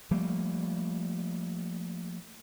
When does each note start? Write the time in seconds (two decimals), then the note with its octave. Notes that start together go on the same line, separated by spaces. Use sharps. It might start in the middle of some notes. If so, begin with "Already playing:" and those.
0.11 F3 G3 A3 A#3